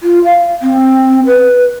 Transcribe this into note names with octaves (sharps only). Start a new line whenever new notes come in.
F4
F5
C4
B4